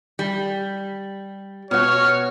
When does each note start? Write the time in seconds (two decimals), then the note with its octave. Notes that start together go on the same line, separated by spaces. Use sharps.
0.19 G3
1.71 B2 F#4 C#5 F6